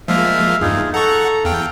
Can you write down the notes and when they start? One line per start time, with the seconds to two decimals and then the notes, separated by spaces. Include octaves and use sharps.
0.08 F3 G#3 A#3 E5 F5
0.61 E2 G2 D#4 F4 G#4
0.94 A4 F#5 A#5 C#6
1.45 E2 F5 G5